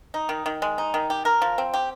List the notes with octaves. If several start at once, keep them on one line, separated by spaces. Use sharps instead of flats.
D#4
D#3
D#3
G#3
D#4
D#3
G4
A#4
F3
C4
G4